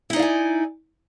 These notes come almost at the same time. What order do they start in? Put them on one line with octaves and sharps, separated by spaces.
E4 D#4 D5 F5 G#5